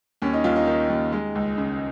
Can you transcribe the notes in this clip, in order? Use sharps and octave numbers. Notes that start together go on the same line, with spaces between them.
D#2 C#4
D#4
D#2 F4
D#4
D#3
D#2
G#3
C#2
C#3